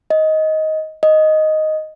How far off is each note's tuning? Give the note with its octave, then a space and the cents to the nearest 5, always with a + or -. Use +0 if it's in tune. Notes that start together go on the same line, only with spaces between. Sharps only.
D#5 +15
D#5 +0